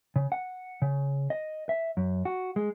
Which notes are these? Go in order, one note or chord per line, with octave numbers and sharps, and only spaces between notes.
C#3
F#5
C#3
D#5
E5
F#2
F#4
G#3